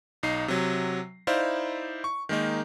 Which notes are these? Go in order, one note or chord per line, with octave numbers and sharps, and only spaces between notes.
B1 D#4 C7
C3 F#3
D#4 E4 C5 D5 E5 F5
C#6
D#3 G#3 A#3 D#4